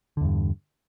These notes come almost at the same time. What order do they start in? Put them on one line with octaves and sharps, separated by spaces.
D3 E2 G2